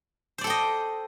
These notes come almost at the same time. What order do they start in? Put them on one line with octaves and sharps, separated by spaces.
C5 D5 A4 G5 D#5